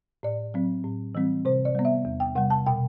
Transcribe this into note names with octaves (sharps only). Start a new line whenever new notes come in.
A2 D5
F#3 C4
A2
E3 G3 C4
C3 C5
D5
G3 B3
E5
E2
G5
C3 G3 F#5
A5
B2 G5